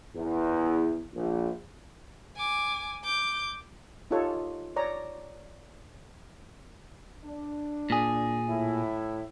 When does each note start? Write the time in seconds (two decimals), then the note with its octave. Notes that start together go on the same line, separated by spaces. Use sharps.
0.15 E2
1.14 A#1
2.37 G#5 D6
3.04 D6 G6
4.11 D#4 F4 G4 A4 C#5
4.76 C#5 D5 A#5
7.25 D4
7.90 A#2 G#4
8.49 A2 E4